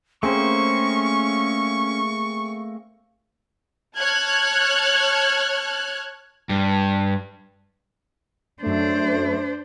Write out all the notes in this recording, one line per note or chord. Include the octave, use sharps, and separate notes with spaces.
A3 A#3 C4 C#4 G#4 C5 C#6
C#5 A5 F6 F#6 G#6
G2
F#2 A3 D4 C5